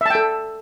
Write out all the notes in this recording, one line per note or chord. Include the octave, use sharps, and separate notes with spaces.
A4 E5 G5 A5